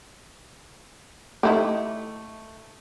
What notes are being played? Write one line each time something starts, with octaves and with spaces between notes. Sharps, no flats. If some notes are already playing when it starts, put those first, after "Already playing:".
A3 D#4 E4 G4